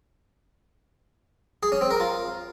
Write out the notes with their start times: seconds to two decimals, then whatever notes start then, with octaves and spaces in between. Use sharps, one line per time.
1.63 G#4
1.72 C#4
1.81 C4
1.91 A#4
2.00 F4